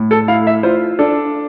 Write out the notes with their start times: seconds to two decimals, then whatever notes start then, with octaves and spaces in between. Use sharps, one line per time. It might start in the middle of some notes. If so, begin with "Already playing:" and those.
Already playing: A2
0.11 A4
0.28 E4 F5
0.47 E5
0.63 F4 C5
0.99 D4 A4